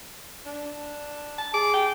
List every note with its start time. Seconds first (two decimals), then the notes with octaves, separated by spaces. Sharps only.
0.46 D4
1.38 A5
1.54 G#4 D6
1.74 G5